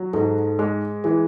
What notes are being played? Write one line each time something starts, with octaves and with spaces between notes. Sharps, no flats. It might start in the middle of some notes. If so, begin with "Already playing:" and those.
Already playing: F#3
G#2 A4
G#3 G#4
E3 G#4